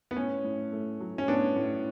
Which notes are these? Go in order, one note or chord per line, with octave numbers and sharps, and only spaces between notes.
B3
A2 C#4
A2
A3
F#3
C#4
A2 B3 D4
A2